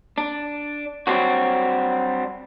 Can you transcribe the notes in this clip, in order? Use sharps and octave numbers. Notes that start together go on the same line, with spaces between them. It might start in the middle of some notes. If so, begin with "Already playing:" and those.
D4
F#3 G3 C4 D4 F#4